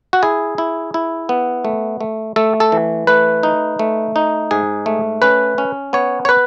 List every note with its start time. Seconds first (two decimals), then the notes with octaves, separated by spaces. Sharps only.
0.13 F#4
0.23 E4 G#4
0.58 E4
0.94 E4
1.29 B3
1.65 A3
2.01 A3
2.36 A3 A4
2.60 A4
2.72 E3
3.07 A3 B4
3.43 D#4
3.79 A3
4.16 D#4
4.51 G#2 G#4
4.86 A3
5.22 C#4 B4
5.58 C#4
5.93 B3 C#5
6.25 C#5
6.29 B4